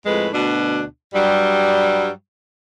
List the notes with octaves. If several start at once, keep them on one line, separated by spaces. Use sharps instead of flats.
F2 A2 G#3 B4
D2 B2 D4
G2 F#3 G3